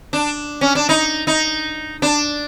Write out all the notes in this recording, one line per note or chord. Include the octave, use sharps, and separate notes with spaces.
D4
C#4
D4
D#4
D#4
D4